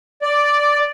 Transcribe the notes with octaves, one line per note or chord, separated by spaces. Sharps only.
D5